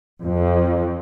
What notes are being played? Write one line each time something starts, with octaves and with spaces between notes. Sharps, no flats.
F2